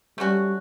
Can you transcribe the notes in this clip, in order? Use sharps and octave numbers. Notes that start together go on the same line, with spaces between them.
G3 A3 C#4 F#4